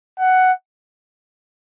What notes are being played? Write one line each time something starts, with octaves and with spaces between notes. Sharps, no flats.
F#5